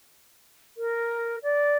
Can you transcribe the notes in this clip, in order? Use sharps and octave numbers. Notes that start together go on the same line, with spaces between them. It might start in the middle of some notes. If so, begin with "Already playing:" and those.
A#4
D5